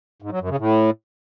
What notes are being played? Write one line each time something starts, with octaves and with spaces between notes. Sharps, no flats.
G#2
F#3
F#2
C#3
A2